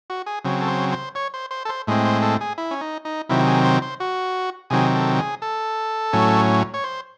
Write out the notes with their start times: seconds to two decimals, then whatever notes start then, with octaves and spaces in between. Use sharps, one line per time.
0.10 F#4
0.26 G#4
0.44 C#3 F#3 C4
0.61 A4
0.68 C5
0.92 C5
1.15 C#5
1.34 C5
1.51 C5
1.65 A4
1.69 C5
1.87 A2 G#3 C4
2.05 C5
2.22 A4
2.41 G#4
2.58 E4
2.71 C#4
2.81 D#4
3.05 D#4
3.29 C3 D#3 F#3 C4 E4
3.47 G#4
3.65 C5
3.82 C5
4.00 F#4
4.70 C3 D#3 F#3 C4 G#4
4.95 A4
5.18 G#4
5.42 A4
6.13 A2 F#3 C#4
6.74 C#5
6.84 C5